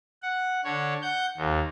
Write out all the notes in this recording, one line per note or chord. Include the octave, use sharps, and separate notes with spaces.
F#5
D3 C#5
F#5 G6
D#2